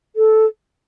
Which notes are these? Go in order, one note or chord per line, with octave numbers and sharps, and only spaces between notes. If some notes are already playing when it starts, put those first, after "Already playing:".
A4